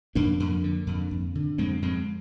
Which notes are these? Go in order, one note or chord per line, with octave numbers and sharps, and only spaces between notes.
F2 A#3 D4
F2
D3
F2
F2
D3
F2 G#3 C4
F2 G#3 C4